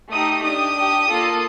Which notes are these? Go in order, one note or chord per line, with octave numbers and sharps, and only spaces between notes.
A3 D#4 G4 D#6
D4 G4 D#6
D4 G4
A#3 F4 A4